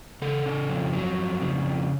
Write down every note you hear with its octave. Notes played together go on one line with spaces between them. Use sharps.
C#3 A4
C#3
F2
F#3
F2
C#3
F2